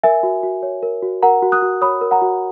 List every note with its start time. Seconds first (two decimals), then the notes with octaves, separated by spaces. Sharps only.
0.03 A#4 E5 G#5
0.23 F#4
0.43 F#4
0.63 C#5
0.83 A#4
1.03 F#4
1.22 A#4 F#5 A#5
1.42 F#4
1.52 D#6 F#6
1.62 F#4
1.81 C#5 B5 D#6
2.01 A#4
2.11 F#5 A#5
2.22 F#4